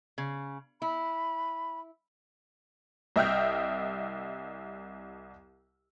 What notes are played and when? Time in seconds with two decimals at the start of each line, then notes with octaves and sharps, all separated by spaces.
0.18 C#3
0.82 E4 B5
3.16 C2 D#5 E5 G5 F6 G6